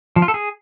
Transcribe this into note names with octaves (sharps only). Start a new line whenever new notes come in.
F3
F4
A4
G#4